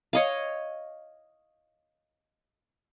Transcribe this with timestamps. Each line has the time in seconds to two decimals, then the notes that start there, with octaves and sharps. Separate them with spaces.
0.13 C#5 D#5 F5